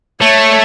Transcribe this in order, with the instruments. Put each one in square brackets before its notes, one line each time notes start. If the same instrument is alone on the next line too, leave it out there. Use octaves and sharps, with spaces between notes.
[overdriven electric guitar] A3 [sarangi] C#5